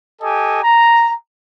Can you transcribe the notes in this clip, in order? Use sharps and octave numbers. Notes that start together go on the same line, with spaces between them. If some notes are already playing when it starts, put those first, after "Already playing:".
G4 A4 D#5 G#5
A#5